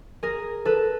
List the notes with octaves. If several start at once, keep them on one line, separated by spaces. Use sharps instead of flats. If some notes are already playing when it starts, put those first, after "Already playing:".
G#4 A#4
A4 B4